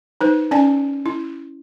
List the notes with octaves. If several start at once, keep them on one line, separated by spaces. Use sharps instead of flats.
D#4 B4 C5
C#4 D5 G#5 A5
E4